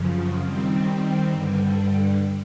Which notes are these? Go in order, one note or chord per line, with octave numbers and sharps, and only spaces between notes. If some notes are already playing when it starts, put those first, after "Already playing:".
Already playing: F#2 C#3 F3
D#3 G3 C4
G2 D3 G3